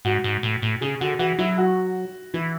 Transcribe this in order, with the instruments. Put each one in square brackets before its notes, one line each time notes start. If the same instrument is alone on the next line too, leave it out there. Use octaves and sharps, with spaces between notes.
[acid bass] G#2 [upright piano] F#4
[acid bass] G#2
A2
A2
[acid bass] C#3 [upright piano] G#4
[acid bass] D3 [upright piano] F#4
[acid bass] E3 [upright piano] F#4
[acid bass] F#3 [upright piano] E4
[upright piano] F#4
[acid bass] E3 [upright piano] E4